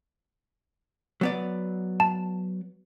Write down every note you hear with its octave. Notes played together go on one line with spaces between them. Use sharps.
F#3 B3 D5
A5